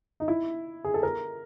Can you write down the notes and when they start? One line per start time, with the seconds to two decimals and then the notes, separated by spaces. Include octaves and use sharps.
0.20 D#4
0.28 E4
0.84 G#4
0.94 A4
1.03 A#4